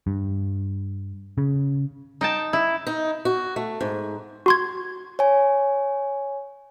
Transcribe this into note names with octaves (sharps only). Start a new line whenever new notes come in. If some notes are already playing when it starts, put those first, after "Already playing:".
G2
C#3
D#4 G5 A5
E4
D#4
F#4
A3
G#2
F#4 C6 G#6
C#5 G#5